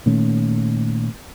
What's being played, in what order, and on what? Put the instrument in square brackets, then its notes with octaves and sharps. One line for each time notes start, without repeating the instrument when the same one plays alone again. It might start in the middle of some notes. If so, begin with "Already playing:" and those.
[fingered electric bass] A#2 D#3 A3 C#4